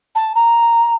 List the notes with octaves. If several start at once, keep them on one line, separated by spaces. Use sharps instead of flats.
A5
A#5